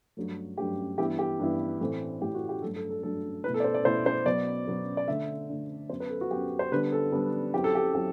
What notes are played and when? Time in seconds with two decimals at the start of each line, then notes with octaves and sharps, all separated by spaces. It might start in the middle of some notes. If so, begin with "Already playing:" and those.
0.17 G2 F#3 A3
0.57 G2 F#3 A3 G4
0.98 G2 E3 B3 E4 G4
1.19 G4
1.40 G2 E3 B3 E4
1.81 A2 E3 A3 C4
2.21 A2 E3 A3 C4 G4
2.34 F#4
2.49 G4
2.62 G2 F#3 A3 D4 A4
2.76 A4
2.90 A4
3.03 G2 F#3 A3 D4 A4
3.44 B2 A3 E4 B4
3.54 A4
3.60 D5
3.64 C5
3.74 D5
3.85 B2 A3 E4 C5
4.06 C5
4.26 B2 F#3 B3 D5
4.67 B2 F#3 B3
4.97 D5
5.08 D3 A3 D4 E5
5.49 D3 A3 D4
5.89 F#2 F#3 B3 C5
6.00 B4
6.10 A4
6.21 F#4
6.31 F#2 F#3 B3 G4
6.59 C5
6.72 D3 G3 B3 D4 B4
6.92 A4
7.12 D3 G3 B3 D4
7.53 F#2 F#3 C4 E4 G4
7.64 A4
7.75 G4
7.95 F#3 C4 E4 G4